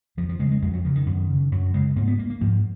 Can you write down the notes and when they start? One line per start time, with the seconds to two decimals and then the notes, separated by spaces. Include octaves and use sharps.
0.17 F2 F3
0.29 F3
0.39 C#3 G#3
0.51 G#3
0.62 F2 G#3
0.74 F#3
0.85 C#3 F3
0.95 D#3
1.06 F#2
1.29 C#3
1.52 F#2 F#3
1.74 C#3 G#3
1.96 G#2 A#3
2.08 B3
2.19 A#3
2.30 A#3
2.41 G#2 F3